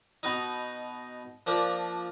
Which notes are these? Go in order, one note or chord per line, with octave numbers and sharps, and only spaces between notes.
B2 D#4
F3 A#3 D4